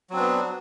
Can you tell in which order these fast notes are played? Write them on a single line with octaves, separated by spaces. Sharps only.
F#3 C4 D4 B3